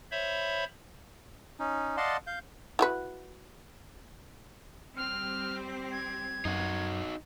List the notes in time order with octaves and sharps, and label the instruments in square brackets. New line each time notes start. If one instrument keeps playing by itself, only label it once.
[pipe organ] C5 C#5 E5 B5
[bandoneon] C#4 D#4
D5 D#5 F5 F#5 A5 C6
F5 G6
[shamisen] E4 F#4 B4
[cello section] G3 C4 G4 [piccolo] F6
[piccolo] G#6
[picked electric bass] F#2 [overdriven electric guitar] D#4 F#4